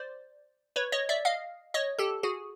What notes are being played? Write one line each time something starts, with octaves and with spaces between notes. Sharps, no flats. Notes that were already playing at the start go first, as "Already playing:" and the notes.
Already playing: C5 D5
B4 C#5
C#5 D#5
D5 E5
D#5 F5
C#5 D#5
G4 A4
F#4 G#4